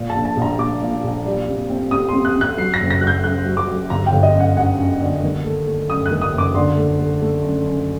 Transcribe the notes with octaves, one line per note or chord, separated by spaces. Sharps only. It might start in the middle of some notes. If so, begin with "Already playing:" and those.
Already playing: A#2
A5
A#1
A5
A#1
A#5
A#1 D6
A#2
A#1
G3
C3
C4
C3 D#6
C6
C3
F#6
C3 F#6
F#3 C7
A#6
F#1
A#6
F#3 F#6
G6
F#2 F#6
F#3
D6
F#3
G1 A#5
G5
G1
D#5
F#2
F#5
F#2 F#5
F#2
D3
D#3
A3
A3
F#2 D#6
F#6
D#3
D#6
F#1
D6
D3 C6
A3
A3
A3
F#2
F#2